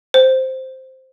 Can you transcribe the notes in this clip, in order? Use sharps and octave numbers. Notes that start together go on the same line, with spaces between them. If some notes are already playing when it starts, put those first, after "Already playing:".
C5